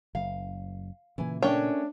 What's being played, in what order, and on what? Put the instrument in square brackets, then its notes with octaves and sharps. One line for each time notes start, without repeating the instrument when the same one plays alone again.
[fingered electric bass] F#1 [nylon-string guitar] F5
[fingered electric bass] A#2 C#3 [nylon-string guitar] E3 G#5
[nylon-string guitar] A3 C#4 A#4 [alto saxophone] D4 [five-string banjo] C#5 G5